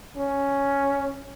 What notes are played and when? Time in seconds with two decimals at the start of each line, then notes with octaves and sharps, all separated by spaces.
0.17 C#4